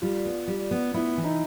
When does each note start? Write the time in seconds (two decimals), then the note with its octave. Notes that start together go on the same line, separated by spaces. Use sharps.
0.02 G3 F4
0.25 B3
0.47 G3
0.71 B3
0.94 B3 E4
1.17 E3
1.24 D#4